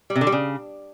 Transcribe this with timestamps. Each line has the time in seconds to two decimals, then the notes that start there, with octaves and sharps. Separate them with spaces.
0.10 G3
0.16 C3
0.21 D3
0.27 G3
0.32 C#3